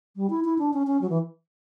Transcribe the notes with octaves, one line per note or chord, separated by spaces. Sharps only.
G3
E4
E4
D4
C#4
C#4
F#3
E3